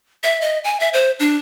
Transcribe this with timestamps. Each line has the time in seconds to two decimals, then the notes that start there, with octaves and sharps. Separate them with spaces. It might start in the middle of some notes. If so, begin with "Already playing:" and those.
0.24 E5
0.41 D#5
0.64 G#5
0.80 E5
0.93 C5
1.19 D4